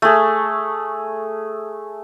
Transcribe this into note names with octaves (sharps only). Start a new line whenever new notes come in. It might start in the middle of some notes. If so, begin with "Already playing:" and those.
A3 G#4